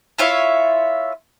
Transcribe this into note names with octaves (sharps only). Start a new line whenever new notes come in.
E4 F4 C#5 E5